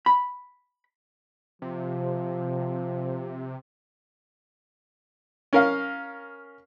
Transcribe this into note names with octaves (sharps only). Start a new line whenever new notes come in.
B5
C3 F3
C#4 A#4 F5